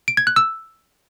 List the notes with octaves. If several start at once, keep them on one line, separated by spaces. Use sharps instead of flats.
D7
G#6
F#6
E6